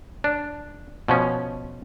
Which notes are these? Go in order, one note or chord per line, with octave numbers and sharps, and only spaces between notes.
D4
B2 F3 C#4